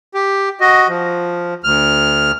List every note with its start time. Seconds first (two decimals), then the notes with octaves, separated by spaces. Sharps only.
0.14 G4
0.60 F#4 D#5
0.88 F3
1.64 D2 F6